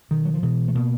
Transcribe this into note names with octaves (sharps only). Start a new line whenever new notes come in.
B2 D#3
F#3
F3
B2 E3
A3
B2 A#3